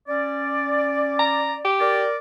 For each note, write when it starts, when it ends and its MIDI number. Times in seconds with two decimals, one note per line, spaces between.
0.08 1.66 61
0.08 1.66 74
1.19 1.55 82
1.65 2.04 67
1.80 2.16 70
1.80 2.16 74